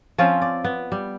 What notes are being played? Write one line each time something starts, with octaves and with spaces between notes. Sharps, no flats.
F3 C4 C#4 F4
D5
B3
G3